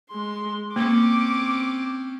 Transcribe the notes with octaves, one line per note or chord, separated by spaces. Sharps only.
G#3 C6
A#3 C4 C#4 D6